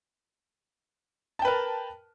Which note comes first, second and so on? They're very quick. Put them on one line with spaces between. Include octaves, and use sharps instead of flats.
A5 G5 B4 A#4